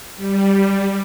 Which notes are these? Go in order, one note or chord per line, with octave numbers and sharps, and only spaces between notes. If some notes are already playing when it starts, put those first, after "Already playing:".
G3